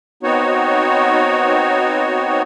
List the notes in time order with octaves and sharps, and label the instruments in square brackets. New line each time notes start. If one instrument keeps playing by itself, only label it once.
[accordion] B3 C4 D#4 F#4 C#5